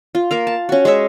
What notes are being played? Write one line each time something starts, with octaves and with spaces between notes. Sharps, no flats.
F4
A#3 A#4 F5
A5
C#4 F#4
G#3 C#4 C#5 E5